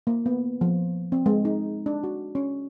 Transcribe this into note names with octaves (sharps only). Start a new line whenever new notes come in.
A#3
B3
F3
C4
G#3
D#4
D4
F#4
C#4